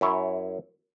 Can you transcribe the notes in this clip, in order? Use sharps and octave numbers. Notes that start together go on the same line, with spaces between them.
F#2 E4 C#5